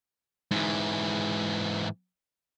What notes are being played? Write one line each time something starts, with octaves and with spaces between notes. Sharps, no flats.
G#2 E3